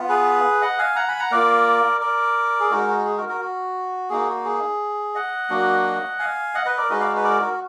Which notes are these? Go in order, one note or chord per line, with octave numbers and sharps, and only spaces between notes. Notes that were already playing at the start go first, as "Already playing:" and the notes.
Already playing: B3 F4
G#4 B4
D#5 F#5
F5 G#5
F#5 A#5
G#5 B5
F#5 A#5
A#3 F4 A#4 D5
A#4 D5
G#4
G#3 D#4 F#4 A#4
F#4
G#4
F#4 A#4
F#4 A#4
F#4
A#3 D#4 F#4 G#4
F#4
G#4
D#5 F#5
F#3 A#3 D4 F#4
F5 G#5
D#5 F#5
B4 D#5
A#4 D5
G#3 D#4 F#4 B4 D#5
D5 F5
B4
A#4 D5
F#4 A#4